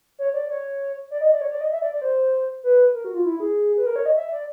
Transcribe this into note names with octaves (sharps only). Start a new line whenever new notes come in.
C#5
D5
C#5
D5
D#5
D5
C#5
D5
D#5
E5
D5
D5
C5
B4
A#4
F#4
F4
E4
G#4
B4
A#4
C#5
D#5
E5
D5